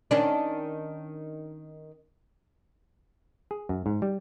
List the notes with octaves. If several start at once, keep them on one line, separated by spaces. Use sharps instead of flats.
D#3 C#4 D4
G#4
F#2
G#2
G3